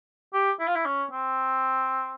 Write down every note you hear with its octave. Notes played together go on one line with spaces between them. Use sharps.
G4
E4
F4
E4
C#4
C4